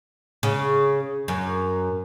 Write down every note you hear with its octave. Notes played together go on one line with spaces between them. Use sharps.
C#3
F#2